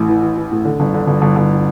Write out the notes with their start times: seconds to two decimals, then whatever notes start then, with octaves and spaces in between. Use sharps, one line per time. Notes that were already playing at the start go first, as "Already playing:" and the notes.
Already playing: A1 A2
0.09 E3
0.22 E3
0.37 E3
0.52 A2
0.65 D3
0.80 G1
0.94 D3
1.07 G1
1.22 G1
1.36 G1